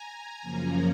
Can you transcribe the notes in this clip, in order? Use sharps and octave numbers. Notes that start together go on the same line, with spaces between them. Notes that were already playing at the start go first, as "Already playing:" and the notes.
Already playing: G#5 A#5
F#2 C#3 F3 A#3 C#4